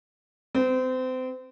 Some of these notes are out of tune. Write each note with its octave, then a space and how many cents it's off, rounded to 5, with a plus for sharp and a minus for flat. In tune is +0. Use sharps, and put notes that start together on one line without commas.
C4 -30